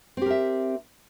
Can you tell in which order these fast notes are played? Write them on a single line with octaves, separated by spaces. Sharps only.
C4 G4 A#4 E5